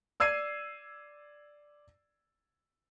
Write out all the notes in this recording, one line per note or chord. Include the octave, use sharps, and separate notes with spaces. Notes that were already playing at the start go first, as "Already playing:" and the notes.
D5 E6 G#6 C7 D#7